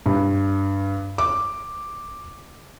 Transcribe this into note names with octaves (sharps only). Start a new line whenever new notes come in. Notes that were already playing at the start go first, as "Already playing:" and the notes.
G2
D6